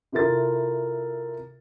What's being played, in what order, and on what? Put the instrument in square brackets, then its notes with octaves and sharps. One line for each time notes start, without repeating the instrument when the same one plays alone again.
[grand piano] C3 E4 F4 A4 A#4 A6